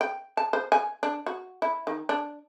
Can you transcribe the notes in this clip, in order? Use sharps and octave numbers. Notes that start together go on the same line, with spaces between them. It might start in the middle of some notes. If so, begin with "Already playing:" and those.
G5
A5
C5
G#5
D4
F#4
E4
D#3
D4